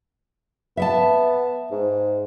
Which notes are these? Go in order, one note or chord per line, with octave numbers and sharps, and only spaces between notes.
B3 E5 F#5 A5
G#2